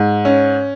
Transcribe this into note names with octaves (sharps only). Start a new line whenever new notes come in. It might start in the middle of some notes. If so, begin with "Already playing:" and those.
Already playing: G#2
C#4